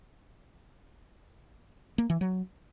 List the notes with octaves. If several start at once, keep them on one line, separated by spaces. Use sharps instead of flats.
A#3
E3
F#3